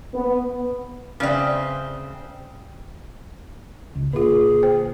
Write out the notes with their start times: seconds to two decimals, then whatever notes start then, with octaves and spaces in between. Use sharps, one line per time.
0.13 B3
1.20 C#3 C4 B4 D5 E5
3.95 C#2
4.13 A#2 D3 F4 G#4
4.63 C5 G5